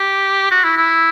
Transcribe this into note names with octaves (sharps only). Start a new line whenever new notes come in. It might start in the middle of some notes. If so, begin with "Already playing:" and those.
Already playing: G4
F#4
E4
E4